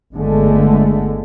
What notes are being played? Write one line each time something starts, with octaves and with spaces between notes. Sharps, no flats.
G1 D3 G#3 A3